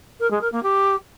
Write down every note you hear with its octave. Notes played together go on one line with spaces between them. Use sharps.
A#4
G#3
A#4
A#3
G4